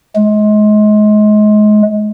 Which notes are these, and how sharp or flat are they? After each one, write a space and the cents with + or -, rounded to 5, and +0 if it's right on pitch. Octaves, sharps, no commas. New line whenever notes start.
G#3 +30